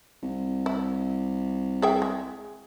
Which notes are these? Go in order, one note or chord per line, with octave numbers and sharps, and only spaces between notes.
C2
E4
G#4 E5 G5
G#3